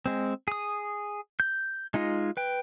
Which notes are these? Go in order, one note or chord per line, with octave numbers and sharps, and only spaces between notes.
G#3 C4
G#4 D#6
G6
G#3 D#4 F4 D#5
B4 G5